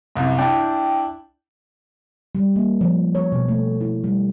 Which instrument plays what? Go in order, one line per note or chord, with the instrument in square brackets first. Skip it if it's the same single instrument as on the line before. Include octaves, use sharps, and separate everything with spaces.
[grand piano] C2 F#2
[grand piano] D4 E4 [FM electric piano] G5
[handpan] G3
A#3
F3
C#5
B2
A3
E4
G3